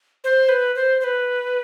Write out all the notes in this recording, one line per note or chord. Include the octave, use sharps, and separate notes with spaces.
C5
B4
C5
C5
B4